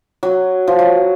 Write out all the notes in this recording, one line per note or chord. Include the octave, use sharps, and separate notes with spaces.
F#3
F3
F#3